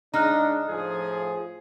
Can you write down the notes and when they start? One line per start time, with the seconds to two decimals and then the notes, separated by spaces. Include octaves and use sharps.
0.14 C#3 G#3 D4 D#4 A#5 F6 F#6
0.68 A2 F3 G#4